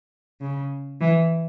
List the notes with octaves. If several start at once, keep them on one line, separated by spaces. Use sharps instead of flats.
C#3
E3